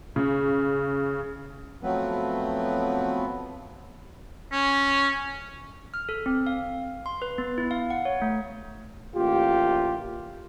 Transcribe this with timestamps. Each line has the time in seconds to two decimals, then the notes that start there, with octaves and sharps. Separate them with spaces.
0.16 C#3
1.83 F3 F#3 A3 B3 C4 B4
4.52 C#4
5.94 F6
6.09 A4
6.26 C4
6.47 F5
7.06 C6
7.22 B4
7.38 B3
7.58 E4
7.71 F5
7.90 F#5
8.05 C#5
8.22 A3
9.14 A1 A#3 F4 G4